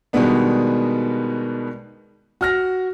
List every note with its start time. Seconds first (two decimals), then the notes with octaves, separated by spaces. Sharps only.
0.13 B2 D#3 G3 G#3 B3 D4
2.41 F#4 F6 A#6